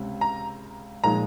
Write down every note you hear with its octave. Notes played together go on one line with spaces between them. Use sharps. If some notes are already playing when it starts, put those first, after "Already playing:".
Already playing: C#2 C3 C#4
A#5
A#2 F3 G#3 D#4 A#5